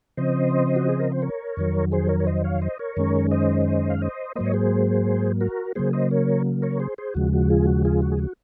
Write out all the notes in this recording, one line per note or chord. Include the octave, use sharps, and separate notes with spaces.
C#3 F3 C4 C5 D#5
F#4
G#4
A#4
C5
A#4 C#5
F2 D#3 F#3
G#4 C5
A#4 C#5
C#5
C5 D#5
C#5 F5
C5 D#5
A#4 C#5
F#2 D#3 G#3 C#4
C5 D#5
F5
C5 D#5
G#2 F#3 A#3 C5 D#5
C#5
G#4 C5
F#4 A#4
C#3 F#3 A#3 G#4 C5
C5 D#5
A#4 C#5
A#4 C#5
G#4 C5
G#4 C5
D#2 C#3 F3 G#3 F#4
F#4
F4 G#4
F#4
F4 G#4
F#4
G#4
F#4